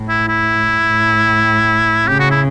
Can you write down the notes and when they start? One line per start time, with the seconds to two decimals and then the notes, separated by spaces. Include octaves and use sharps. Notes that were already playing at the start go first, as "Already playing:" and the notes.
Already playing: A2
0.09 E4
0.28 E4
0.88 A2
2.07 C#3 G4
2.19 F#4
2.30 E4